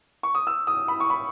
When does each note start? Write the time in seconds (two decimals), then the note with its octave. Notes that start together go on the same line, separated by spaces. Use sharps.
0.23 C#6
0.35 D#6
0.47 E6
0.67 D#6
0.88 B5
1.00 C#6
1.10 B5